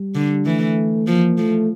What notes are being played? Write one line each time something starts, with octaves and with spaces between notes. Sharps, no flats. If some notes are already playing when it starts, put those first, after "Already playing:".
Already playing: G3
D3
E3 A3
F3 A#3
F3 A3